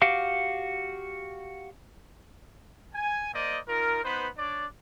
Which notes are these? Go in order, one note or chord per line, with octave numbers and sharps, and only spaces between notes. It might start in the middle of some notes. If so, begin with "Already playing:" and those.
F#4 G4 F5 D6
G#5
A#3 C5 D5 D#5
D#4 F4 A#4
B3 D#4 B4 C5 B5
D4 C#5 D5